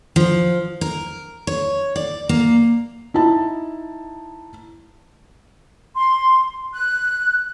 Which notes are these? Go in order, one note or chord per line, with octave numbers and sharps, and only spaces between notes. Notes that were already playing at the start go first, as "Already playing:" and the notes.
F3
A#4
C#5
D5
A#3
D#4 E4 A5
C6
F#6